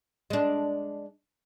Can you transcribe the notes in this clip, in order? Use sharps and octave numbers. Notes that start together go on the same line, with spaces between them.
G#3 D4